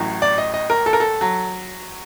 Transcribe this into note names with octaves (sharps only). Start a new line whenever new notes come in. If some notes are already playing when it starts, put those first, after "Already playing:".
Already playing: A1 A2 F#3
D5
D#5
D#5
A#4
A4
A#4
A4
F#3